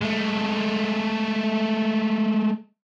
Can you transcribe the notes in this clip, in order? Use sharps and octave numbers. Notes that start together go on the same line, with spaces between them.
G#3 A3